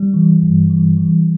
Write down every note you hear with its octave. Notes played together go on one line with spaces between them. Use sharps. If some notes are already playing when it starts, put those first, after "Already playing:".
Already playing: G3
E3
G2
E3
E3